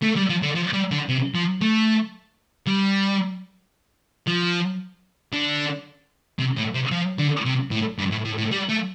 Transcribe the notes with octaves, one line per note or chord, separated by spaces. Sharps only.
A3
G3
F3
D3
F3
G3
D3
C3
F3
A3
G3
F3
D3
C3
A2
C3
F3
D3
C3
A2
G2
A2
A2
A2
G3
A3